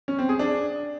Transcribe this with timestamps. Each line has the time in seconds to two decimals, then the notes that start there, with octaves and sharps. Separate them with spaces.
0.08 C#4
0.18 C4
0.29 G#4
0.39 D4